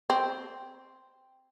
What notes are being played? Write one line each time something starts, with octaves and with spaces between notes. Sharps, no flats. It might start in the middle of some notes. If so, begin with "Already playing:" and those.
C4